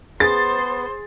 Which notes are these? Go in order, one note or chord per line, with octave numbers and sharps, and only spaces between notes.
B3 G#4 C5 A6